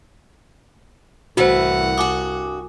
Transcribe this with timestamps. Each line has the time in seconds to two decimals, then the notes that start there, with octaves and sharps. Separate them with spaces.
1.37 C2 F#2 A2 E3 F#4 C5 F#5
1.98 G2 F#4 G#5 D6 D#6